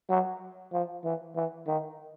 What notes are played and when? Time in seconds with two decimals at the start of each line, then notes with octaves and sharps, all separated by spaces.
0.10 F#3
0.73 F3
1.04 E3
1.36 E3
1.68 D#3